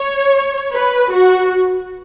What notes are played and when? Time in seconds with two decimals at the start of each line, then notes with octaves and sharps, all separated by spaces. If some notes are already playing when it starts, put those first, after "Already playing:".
Already playing: C#5
0.72 B4
1.11 F#4